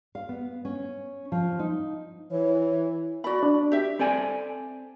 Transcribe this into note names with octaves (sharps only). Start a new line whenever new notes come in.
F5
B3
C#4
F3
D#4
E3 C#5
F#4 D5 B5
D4
G4 E5
C4 A4 D5 G#5